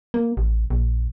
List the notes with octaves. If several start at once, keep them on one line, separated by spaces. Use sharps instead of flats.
A#3
A1
A#1